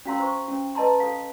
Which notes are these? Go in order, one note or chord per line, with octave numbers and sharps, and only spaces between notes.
C#4 F#4 F5 A#5 C6 E6
C5 C#6
C#4
B4 D#5 A5 A#5 C6
A4 F5